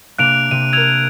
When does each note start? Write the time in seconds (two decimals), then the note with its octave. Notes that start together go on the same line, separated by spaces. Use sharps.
0.18 C3 A#3 D4 F#6 D7 F7
0.51 C3 D#7
0.73 A#4 E6 G#6 F7